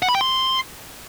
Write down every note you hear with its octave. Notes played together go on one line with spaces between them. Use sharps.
F#5
B5
G5
C6